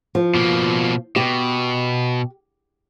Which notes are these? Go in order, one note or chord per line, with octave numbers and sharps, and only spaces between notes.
F3
B2 A#3
B2 G4